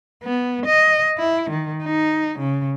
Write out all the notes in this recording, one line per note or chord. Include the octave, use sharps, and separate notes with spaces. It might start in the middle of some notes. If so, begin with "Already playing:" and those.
B3
D#5
E4
D#3
D#4
C#3